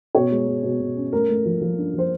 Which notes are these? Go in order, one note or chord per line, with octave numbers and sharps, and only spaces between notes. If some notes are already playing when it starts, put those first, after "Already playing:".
B2 C#5
G#3
G#3
B2
B2
C#4
A3 A#4
A3
F3
F3
D4
F3 C5